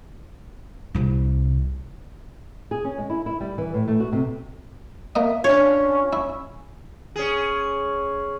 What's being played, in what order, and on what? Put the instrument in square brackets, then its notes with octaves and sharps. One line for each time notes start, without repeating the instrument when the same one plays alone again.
[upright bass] C2 C3
[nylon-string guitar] G#4
C#4
G#3
E4
E4
G3
E3
A2
A3
F#4
C3
[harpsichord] A#3 A#4 D#5 [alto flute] E5
[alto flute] C#4 [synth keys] D4 F4 [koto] C#5
[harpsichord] E4
[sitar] C#4 G#4